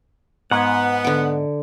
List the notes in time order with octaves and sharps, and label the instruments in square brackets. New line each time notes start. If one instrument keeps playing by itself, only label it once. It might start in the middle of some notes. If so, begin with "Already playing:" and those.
[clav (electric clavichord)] G#2 G#5 [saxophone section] B3 [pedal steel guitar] F#5
[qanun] D3 D6